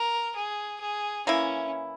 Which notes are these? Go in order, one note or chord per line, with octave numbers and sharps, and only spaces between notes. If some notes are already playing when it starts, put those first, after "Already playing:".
Already playing: A#4
G#4
G#4
E3 A#3 C#4 E4